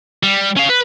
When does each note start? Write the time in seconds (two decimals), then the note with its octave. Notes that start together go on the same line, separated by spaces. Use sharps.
0.23 G3
0.57 C#4 F5
0.69 B4